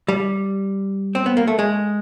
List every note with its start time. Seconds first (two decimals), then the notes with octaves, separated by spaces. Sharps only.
0.08 G3
1.15 C4
1.26 B3
1.37 A#3
1.48 A3
1.59 G#3